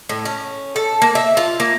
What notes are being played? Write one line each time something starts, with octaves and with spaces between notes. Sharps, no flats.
A2
C#4
A4
A#3
E5
F4
A#3